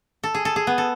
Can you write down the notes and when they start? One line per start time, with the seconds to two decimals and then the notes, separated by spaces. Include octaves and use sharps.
0.23 A4
0.34 G#4
0.45 A4
0.56 G#4
0.67 B3
0.78 A4